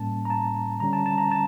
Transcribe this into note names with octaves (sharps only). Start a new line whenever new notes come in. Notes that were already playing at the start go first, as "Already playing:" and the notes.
Already playing: A2 G3 A#3 C#4 A5
A#5
A5
D3 G3 C#4 A#5
A5
A5
A#5
A5